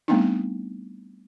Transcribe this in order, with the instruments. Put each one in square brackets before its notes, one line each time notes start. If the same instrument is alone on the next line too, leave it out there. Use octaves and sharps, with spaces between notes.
[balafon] G3 A3 B3 C4 D4 D#4